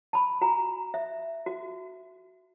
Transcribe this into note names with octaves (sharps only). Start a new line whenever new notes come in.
A5 B5
F#4 G#5 A#5
E5
F#4